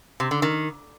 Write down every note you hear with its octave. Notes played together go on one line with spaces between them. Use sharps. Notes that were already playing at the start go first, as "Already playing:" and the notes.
C3
D3
D#3